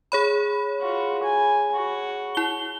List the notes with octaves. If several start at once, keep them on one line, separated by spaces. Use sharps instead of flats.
G#4 C#5 B5
F4 F#4
G#5
F#4
E4 G7